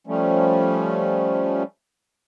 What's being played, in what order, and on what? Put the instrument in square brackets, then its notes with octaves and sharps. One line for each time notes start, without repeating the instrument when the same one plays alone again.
[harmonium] F3 G3 A3 C#4